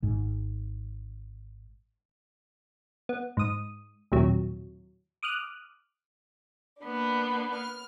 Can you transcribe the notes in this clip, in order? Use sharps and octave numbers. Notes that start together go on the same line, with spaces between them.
G#1 G#2
B3
G#2 D#6
A#1 D#2 A2 C3 F#3
D6 D#6 F6 F#6
A#3 B3 D4
F6